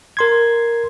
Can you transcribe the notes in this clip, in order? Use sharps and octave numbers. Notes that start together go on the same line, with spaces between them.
A#4 C6 G#6